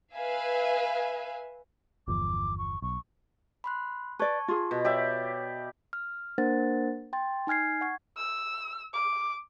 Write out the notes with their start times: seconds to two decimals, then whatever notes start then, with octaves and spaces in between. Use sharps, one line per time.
0.15 B4 E5 F5 G#5
2.08 G1 E2 F3 D6
2.58 C#6
2.82 B1 C#6
3.64 B5 C6 F#6
4.19 B4 D5 A5 C#6 G#6
4.48 F4 G#4
4.71 B2
4.85 G4 C#5 D5 E5
5.93 F6
6.38 A#3 D4 A#4 C5 F#5 A6
7.13 G5 C6 A6
7.47 D#4 G#5 F6 G#6 C7
7.81 F#5 C#6 G#6
8.17 E6
8.93 D6